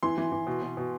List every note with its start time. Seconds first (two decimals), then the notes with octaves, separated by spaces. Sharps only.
0.03 E3 C6
0.18 E3
0.32 E3
0.47 B2
0.62 B2
0.77 B2